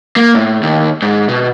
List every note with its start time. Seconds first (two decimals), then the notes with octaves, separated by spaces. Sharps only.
0.16 A#3
0.35 A2
0.63 D#2
1.02 G#2
1.29 B2